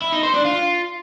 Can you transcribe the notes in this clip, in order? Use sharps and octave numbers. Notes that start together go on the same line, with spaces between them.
E4
D#4
C5
D4
F4